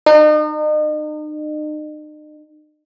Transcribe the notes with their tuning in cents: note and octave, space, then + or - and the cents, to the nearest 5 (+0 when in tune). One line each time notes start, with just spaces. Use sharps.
D#4 -40